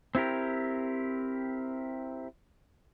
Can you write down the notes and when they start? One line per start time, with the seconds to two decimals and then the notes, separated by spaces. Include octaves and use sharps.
0.15 C4 E4 G4 A#4